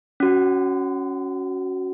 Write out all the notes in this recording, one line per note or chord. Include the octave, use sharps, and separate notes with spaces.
C#4 F#4